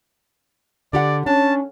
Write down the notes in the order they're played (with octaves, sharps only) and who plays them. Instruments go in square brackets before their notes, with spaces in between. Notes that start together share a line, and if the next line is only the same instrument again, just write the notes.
[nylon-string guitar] D3 G4 F#5 [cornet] D5
[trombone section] C#4 [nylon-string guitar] D4 [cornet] A5